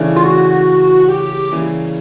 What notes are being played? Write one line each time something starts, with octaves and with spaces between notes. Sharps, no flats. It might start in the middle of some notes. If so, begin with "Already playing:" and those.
Already playing: C#3 E3 A3 D4
F4
F#4
G4
C#3 E3 G3 A#3